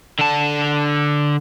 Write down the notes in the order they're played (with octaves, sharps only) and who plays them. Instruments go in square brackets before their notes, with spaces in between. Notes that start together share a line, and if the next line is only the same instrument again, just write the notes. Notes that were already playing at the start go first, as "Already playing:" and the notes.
[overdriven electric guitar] D3 A5